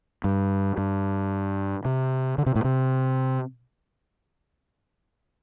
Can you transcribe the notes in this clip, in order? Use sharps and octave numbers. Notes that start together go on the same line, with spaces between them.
G2
G2
C3
D3
C3
A2
C3